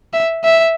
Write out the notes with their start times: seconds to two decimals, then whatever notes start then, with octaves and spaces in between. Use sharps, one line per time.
0.13 E5
0.44 E5